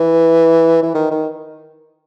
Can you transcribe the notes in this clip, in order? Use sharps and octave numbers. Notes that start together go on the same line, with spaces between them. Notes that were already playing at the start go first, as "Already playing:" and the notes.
Already playing: E3
E3
D#3
D#3